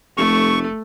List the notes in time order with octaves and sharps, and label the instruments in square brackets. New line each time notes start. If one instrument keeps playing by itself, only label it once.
[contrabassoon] F1 [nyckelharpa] A3 [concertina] C#6